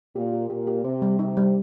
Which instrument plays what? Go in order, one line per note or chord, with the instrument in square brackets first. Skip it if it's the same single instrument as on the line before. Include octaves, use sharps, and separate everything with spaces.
[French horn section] A#2 [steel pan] G4
[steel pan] G4
[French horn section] A#2 [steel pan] G4
[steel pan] G4
[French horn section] C3 [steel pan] C5
[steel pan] G3
[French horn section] C3 [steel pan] D#4
[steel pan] G3